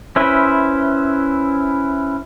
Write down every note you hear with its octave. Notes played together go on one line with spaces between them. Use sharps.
C#4 E4 B4 C5 E5